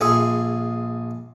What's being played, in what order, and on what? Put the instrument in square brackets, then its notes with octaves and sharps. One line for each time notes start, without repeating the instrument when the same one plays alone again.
[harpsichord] A#1 F4 G#4 E5 C#6